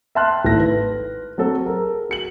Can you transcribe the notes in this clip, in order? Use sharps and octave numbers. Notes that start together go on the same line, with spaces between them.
E5 G5 A5 C6 F6 F#6
G#1 A3 E4 A#6
B4
F#3 C4 A4
G#4 A#4
F#4 C#7 F#7